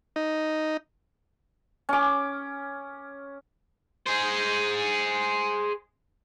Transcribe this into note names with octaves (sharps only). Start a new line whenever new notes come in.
D#4
C#4 D6
G#4 C5